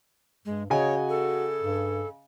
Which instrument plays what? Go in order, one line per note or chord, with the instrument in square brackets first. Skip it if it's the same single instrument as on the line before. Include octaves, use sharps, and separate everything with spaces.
[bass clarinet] G2 [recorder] G#3
[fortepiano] C#3 D#5 G#5 [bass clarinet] F#4 [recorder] C#5
[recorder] A4
[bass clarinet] G2